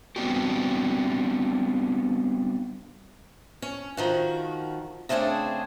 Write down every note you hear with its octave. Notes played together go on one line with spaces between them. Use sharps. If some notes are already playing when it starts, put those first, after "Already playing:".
G3 B3 C4 D4 F#4 G4
C#4
D#3 F3 F#4
C#3 A3 C4 D4 G#4